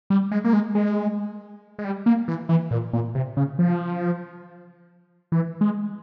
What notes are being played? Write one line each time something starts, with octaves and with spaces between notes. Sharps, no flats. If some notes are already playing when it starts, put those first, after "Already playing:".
G3
G#3
A#3
G#3
G#3
G#3
G3
A#3
E3
E3
A#2
A#2
C3
C#3
F3
E3
G#3